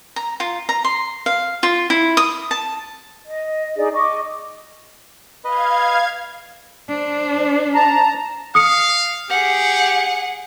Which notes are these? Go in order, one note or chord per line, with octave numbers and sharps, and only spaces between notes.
A#5
F4
A#5
C6
F5
F4
E4
D#6
A5
D#5
D#4 G#4 D5
D#5 C#6 D6
B4 D#5 F5 G#6
D4 C5
A5 A#5
F5 D#6 C#7
G4 G#4 F#5